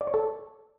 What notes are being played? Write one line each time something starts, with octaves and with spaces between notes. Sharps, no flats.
D5
C#5
A4